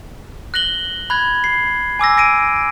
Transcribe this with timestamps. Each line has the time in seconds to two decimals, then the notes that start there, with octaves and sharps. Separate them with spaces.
0.54 F#6 A#6 F#7 G7
1.10 B5 F#6 G#6
1.44 C7
1.99 G#5 D6 E6 A#6
2.17 A#6 D7 D#7